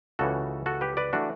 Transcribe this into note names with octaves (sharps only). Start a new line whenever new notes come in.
C#2 C#3 E3 F#4 A4
F#4 A4
G4 B4
B4 D5
E3 A3 D4 F#4